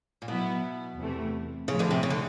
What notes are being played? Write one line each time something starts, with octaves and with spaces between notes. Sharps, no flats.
A#2
B2 F#3 B3 E4
E2 C3 E3 A3
A2 C#3 F3 G#3
D2 D3
C3
C#3
D3